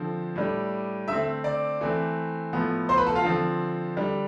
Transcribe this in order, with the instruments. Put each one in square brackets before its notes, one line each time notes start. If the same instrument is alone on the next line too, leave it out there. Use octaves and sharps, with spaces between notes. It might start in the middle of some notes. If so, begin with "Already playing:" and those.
Already playing: [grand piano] D3 F3 C4
A2 G3 D4
D3 A3 C4 E5 E6
D5 D6
E3 A3 C4
A2 F3 B3
C5 C6
B4 B5
A4 A5
F4 F5
D3 F3 C4
D3 G3 D4